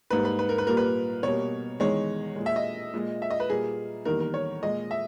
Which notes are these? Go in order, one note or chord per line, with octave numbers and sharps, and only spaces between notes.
G#2 G3 A#3 B4
B4
B4
A#4
B4
A#2 G3 A#3 A#4
B4
B2 G3 A#3 C#5
E2 D#3 G#3 C#5
A#2 G#3
E5
D#5
A#2 G#3
E5
D#5
B4
A#2 G3 A#3 G#4
E2 D#3 G3 A#3 A#4
A#4
C#5
A#2 G#3 D#5
E5